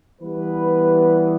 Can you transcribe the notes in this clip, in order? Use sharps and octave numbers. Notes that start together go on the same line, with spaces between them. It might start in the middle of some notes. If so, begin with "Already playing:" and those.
E3 G3 B3 B4